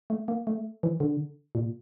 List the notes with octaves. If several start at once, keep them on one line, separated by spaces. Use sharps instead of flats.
A3
A#3
A3
E3
D3
A#2